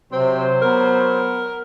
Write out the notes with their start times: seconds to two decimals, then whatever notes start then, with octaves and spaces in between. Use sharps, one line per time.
0.12 C3 F#3 C4 C5
0.62 B3 A#4